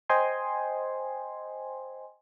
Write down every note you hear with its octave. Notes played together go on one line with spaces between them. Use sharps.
C5 D#5 G5 G#5 C6